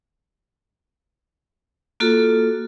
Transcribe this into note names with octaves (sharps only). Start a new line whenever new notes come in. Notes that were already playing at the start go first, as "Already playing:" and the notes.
A#3 F4 F#4 A4